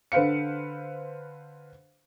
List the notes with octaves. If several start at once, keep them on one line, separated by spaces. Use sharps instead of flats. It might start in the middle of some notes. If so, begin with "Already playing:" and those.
D3 B4 C5 F5 C#7